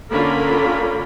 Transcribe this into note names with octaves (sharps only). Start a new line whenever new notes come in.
D3 A#3 C#4 F4 A#4 B5